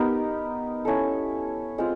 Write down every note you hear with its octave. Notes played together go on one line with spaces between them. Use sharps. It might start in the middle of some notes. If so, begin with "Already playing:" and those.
Already playing: B3 D#4 G4 A#4
C#4 E4 A4
G#3 C4 F4